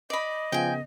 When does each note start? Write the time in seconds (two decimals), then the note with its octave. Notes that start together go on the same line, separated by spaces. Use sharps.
0.10 D5 D#5 B5
0.52 C#3 F3 B3 G5 G#5